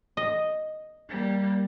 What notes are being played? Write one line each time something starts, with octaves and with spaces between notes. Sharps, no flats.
D#5
G3 A#3